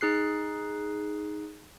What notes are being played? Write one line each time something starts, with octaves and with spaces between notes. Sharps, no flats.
D#4 G#4 F#6 C7